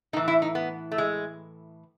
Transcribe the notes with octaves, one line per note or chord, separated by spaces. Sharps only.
A2 E3 D#4
E4
D#4
B3
A3
G#3